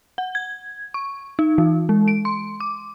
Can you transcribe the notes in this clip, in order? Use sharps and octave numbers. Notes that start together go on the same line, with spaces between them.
F#5
G#6
C#6
D#4
E3
G#3
D7
C6
D6